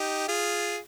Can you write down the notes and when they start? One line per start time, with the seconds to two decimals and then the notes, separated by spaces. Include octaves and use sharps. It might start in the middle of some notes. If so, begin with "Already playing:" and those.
Already playing: D#4 G4
0.28 F4 G#4